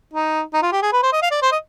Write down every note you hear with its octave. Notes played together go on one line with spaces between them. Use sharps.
D#4
D#4
F4
G4
G#4
B4
C5
D#5
F5
D5
C5
D#5